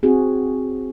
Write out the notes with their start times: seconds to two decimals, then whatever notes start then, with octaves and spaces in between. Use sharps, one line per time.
0.03 C4 F#4 G#4